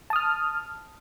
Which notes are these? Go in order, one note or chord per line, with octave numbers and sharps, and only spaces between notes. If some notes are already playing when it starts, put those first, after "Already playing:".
A5 D#6 F6